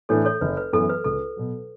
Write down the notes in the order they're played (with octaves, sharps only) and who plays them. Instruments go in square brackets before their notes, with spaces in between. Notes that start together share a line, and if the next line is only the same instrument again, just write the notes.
[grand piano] A2 E3 A3 D4 [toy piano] A4 C#5
[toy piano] A4 C#5
[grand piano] F#1 [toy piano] B4
[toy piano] B4
[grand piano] F#2 E3 B3 [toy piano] A4
[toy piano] B4
[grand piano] C#2 [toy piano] A4
[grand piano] B2 F#3